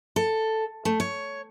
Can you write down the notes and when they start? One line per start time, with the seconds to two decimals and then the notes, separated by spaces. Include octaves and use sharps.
0.16 A4
0.85 A3
1.00 C#5